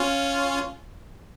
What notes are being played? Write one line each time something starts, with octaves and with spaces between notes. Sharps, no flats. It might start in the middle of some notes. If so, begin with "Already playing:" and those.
Already playing: C#4 F4